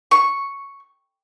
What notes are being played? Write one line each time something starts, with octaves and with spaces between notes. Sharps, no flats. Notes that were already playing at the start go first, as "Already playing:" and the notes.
C#6